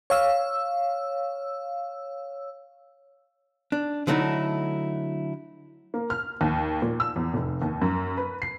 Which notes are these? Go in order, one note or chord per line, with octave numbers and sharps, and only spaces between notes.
C#5 F5 E6
D4
D3 F#3 A3 D#4 E4
A#3
F6
D#2
A#2
E6
E2
F1
D#2
F#2
B4
C7